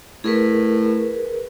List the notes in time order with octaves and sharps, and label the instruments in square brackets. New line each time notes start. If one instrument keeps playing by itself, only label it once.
[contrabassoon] A2 [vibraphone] G#4 A#4 B4